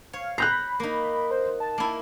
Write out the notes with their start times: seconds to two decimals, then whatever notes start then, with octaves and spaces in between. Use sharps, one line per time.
0.13 C#5 F5
0.38 A#5 B5 F#6 G6 C7
0.80 A#3 D#4
1.31 C5
1.60 A5
1.78 A#3 E4